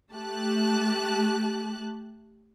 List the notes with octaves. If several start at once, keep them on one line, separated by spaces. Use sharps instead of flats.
A3 G4 A5 F#6